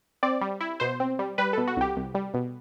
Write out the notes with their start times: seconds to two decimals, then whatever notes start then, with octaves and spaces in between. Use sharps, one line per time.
0.23 C4 D5
0.41 G3
0.61 E4
0.80 B2 C5
1.00 C4
1.19 G3
1.38 G3 B4
1.53 B2 A4
1.67 F#4
1.77 C2 G4
1.96 C2
2.15 G3
2.34 B2